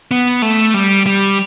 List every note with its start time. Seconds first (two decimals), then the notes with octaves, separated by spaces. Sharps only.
0.11 B3
0.42 A3
0.74 G3
1.06 G3